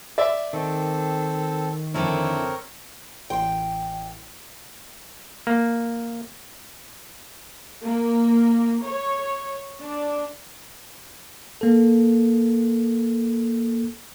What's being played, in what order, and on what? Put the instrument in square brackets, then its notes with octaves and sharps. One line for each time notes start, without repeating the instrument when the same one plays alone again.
[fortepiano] D5 E5
[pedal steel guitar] D#3 [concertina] C4 A4
[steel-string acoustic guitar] F2 D3 E4 [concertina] C4 A#4 C#5
[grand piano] A1 C6 [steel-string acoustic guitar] G5
[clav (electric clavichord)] A#3
[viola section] A#3
C#5
D4
[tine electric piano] A#3 A4